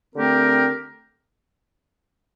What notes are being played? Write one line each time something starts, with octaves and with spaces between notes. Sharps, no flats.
D3 A3 C4 G4 A#4